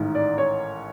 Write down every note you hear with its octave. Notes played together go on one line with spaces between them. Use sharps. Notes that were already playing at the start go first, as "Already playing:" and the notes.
Already playing: A1 G#2 D#3
D5
C#5